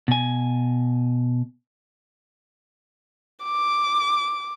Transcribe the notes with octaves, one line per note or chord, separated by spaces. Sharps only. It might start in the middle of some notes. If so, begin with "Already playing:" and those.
B2 G#5
D6